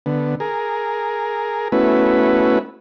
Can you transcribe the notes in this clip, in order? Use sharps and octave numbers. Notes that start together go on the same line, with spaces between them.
D3 B3
G#4 A#4
A3 B3 C#4 E4 F#4 B4